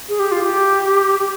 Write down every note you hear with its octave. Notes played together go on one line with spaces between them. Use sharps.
G#4
G4
F4
G4
G4